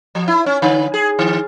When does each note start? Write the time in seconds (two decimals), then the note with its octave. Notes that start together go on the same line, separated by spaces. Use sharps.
0.15 F3
0.28 E4
0.46 C#4
0.62 D3
0.94 G#4
1.19 D#3